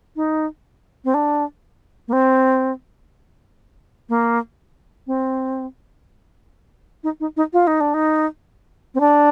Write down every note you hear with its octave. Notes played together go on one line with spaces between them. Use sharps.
D#4
C4
D4
A#3
C4
A#3
C4
D#4
D#4
D#4
F4
D#4
D4
D#4
C4
D4